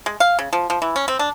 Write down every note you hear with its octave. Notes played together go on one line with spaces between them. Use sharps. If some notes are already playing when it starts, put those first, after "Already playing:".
G#3
F5
C#3
F3
F3
E3
C#4
C4
D4